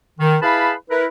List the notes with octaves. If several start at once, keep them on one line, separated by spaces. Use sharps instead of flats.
D#3
E4 G#4 B4 F5 A5 B5
E4 A#4 B4